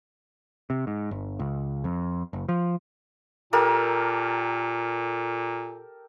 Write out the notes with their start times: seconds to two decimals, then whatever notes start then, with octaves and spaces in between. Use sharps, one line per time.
0.70 C3
0.87 G#2
1.11 G1
1.39 C#2
1.84 F2
2.33 F#1
2.49 F3
3.53 A#2 G4 A4 A#4